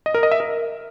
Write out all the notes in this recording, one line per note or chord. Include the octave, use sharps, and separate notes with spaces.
D#5
A#4
D#5
E5
A#4